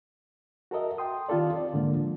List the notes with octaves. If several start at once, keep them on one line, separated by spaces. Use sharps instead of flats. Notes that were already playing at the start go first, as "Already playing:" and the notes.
F#4 A4 A#4 D#5 E5
G5 C6 D#6
D#3 C4 F4 G4 A4 D5
D5
G#2 D3 G#3 A#3 D4
F3